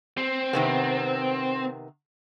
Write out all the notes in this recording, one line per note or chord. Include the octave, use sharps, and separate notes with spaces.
C4
C3 D#3 B3